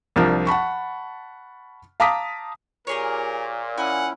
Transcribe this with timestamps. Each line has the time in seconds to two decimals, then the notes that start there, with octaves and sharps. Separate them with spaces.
0.16 C2 F3 D4 A#4
0.47 F#5 A5 B5 C#6
2.00 F5 A5 A#5 D6 D#6 B6
2.87 A#2 G4 G#4 A#4 C#5
3.78 C#4 E4 F#5 G#5